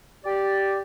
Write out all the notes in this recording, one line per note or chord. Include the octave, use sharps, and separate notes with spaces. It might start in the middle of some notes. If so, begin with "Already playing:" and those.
G4 D5